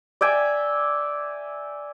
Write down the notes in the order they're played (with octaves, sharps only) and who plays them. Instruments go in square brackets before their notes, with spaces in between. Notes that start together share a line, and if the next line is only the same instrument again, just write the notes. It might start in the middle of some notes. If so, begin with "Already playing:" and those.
[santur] D5 E5 G5 G#5